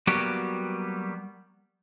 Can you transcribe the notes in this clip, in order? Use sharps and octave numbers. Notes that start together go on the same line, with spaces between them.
F#3 G3 A#3 B3 F#4 G4